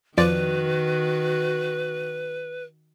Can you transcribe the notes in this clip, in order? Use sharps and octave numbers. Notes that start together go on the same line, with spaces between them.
F2 D#3 F3 F#4 B4 D5